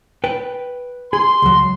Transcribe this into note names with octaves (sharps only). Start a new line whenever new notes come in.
B4 G5
G#4 C6
C#2 F#3